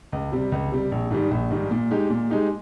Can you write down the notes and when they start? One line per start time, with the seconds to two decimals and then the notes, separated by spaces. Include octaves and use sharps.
0.12 C#2
0.32 C3 G3
0.52 C#2
0.72 C3 G3
0.92 A#1
1.11 G#2 D#3 G3
1.31 A#1
1.50 G#2 D#3 G3
1.71 A#2
1.91 G#3 D#4 G4
2.10 A#2
2.30 G#3 D#4 G4